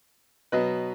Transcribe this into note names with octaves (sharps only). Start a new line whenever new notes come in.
B2 F#3 B4 D#5